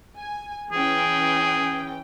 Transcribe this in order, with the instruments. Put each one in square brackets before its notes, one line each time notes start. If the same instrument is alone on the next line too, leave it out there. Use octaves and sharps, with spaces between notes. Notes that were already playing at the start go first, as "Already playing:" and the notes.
[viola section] G#5
[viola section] E3 C#4 G5 [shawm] G#4